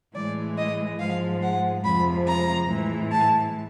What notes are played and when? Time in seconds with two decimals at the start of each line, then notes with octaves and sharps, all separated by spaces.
0.15 A2 E3 G#3 D5
0.57 D#5
0.99 G#2 F3 G#3 F5
1.42 F#5
1.84 F2 C3 F3 G#3 B5
2.26 A#5
2.69 A2 E3 G#3
3.11 A5